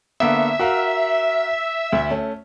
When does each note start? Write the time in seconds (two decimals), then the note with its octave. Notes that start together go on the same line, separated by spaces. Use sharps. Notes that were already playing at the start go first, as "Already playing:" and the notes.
0.20 D3 A#3 B3 E5
0.59 F#4 A#4 F5
1.92 D2
2.11 A3 C#4